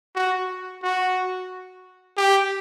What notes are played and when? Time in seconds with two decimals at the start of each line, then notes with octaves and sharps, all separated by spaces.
0.15 F#4
0.83 F#4
2.17 G4